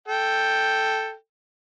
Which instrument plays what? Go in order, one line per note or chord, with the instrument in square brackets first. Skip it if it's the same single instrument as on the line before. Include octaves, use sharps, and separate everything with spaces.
[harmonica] A4 G5